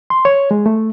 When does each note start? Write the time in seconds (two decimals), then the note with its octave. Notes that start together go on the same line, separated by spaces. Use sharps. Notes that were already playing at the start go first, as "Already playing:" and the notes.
0.10 C6
0.25 C#5
0.51 G#3
0.66 A3